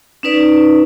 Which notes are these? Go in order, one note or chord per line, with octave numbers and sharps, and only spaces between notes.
C#4 D#4 B4 D5